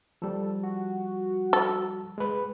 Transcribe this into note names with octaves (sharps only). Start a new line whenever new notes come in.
F3 G3 A4
F#4
A4
G#3 B4